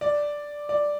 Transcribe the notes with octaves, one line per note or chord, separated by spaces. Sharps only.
D5
D5